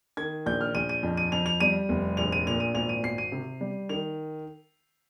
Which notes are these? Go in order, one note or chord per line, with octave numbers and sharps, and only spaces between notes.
D#3 G#6
A#1 G6
F6
A#1 D#7
D#7
F2
D#7
F2 F7
F7
G3 D#7
F1
A#1 F7
D#7
A#2 F7
D#7
G#1 F7
D#7
G#1 C7
D#7
C3
G3
D#3 F7